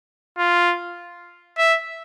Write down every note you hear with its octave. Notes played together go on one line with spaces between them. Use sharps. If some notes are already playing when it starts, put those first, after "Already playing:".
F4
E5